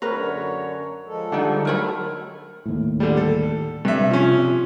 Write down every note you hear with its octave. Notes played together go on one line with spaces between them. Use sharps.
F#2 D3 A#4 B4 C#5 A#5
F3 G#3 A4
D3 G3 D#4 F#5
F#3 A4 A#4 C#5 B5
D#2 A2
D3 G3
A4
G2 C3 E5
F3 C#4
C3